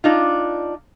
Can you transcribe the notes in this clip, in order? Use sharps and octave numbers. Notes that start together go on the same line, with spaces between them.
D4 D#4 F4